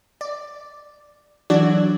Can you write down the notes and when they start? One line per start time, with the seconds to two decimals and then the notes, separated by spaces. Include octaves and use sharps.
0.21 D5
1.50 E3 F#3 D4 F#4 D5